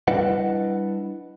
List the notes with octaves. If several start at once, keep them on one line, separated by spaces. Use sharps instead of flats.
G3 D4 E4 B4 D#5 F#5